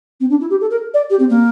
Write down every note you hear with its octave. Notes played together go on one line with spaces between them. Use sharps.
C4
D4
E4
G4
A4
A#4
D5
G4
C4
A#3